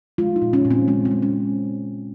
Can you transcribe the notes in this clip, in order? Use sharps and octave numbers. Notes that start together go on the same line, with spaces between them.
G#3 F4
D#4
A#2
C#4
A#2
C4
G#3 C4
C4
G#3
C#4